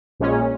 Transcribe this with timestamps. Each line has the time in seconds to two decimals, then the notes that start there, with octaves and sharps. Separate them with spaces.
0.20 A#1 A#2 G#3 C#4